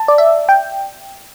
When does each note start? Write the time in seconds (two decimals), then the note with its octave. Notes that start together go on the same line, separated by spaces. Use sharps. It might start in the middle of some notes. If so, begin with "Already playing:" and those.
Already playing: A5
0.08 D5
0.18 E5
0.49 G5